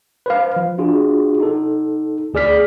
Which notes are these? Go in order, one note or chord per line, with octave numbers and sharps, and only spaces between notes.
B4 C5 F5
F3
D4 F4 F#4 G#4
D#4 A4
D2 G#4 D5 F6 B6